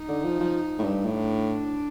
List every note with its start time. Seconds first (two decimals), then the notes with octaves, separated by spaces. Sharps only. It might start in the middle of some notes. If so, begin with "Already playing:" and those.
Already playing: D#4
0.08 D3
0.24 F3
0.40 F3
0.79 A2
0.84 G2
1.05 A2 D4